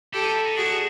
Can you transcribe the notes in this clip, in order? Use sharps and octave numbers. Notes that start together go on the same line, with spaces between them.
E4 G4 A4
D#4
E4
D#4
D4 F#4 G#4